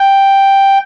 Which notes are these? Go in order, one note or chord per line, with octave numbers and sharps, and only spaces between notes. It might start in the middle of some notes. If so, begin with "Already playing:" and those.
Already playing: G5